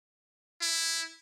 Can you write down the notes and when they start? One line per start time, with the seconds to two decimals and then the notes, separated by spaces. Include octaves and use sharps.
0.62 E4